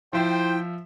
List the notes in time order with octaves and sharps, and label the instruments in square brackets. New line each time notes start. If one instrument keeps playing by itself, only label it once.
[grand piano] F3 E5 E7 [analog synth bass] E4 [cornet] C5 [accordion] G5